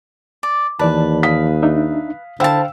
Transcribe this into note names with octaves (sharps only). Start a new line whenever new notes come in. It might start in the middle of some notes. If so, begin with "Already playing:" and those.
D5
D#2 E3 B4 D5 A5
F5 D#6 B6
D4 D#4 E5
D3 E4 C5 F5 G5 A5 E6